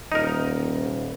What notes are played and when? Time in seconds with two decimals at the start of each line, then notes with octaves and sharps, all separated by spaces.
0.12 D#1 D#4 A#4